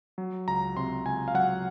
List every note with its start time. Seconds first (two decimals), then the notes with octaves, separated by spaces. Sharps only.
0.18 F#3
0.48 C#2 A#5
0.76 C3 C6
1.05 C#2 G#5
1.28 F5
1.34 F#3 F#5